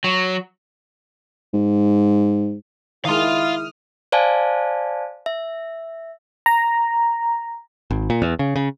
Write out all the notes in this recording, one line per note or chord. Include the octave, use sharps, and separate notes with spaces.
F#3
G#2
D#3 G#3 E4 F5 C6 D#6 F6
C5 D5 F5 G#5 A5
E5
A#5
G#1
A#2
E2
C#3
C#3